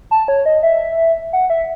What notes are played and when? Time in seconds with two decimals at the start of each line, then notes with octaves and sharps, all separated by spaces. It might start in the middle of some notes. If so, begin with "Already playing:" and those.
0.11 A5
0.28 C#5
0.46 D#5
0.63 E5
1.33 F#5
1.50 E5